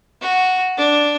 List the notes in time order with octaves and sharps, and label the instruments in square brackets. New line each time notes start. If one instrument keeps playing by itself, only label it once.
[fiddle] F#4
D4